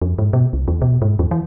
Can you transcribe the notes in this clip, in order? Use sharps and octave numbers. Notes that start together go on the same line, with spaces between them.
F2
G#2
B2
C2
E2
B2
G#2
E2
E3